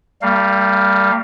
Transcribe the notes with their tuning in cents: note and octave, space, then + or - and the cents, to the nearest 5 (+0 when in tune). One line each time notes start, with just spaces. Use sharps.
G3 +0 A#3 -45 F5 +0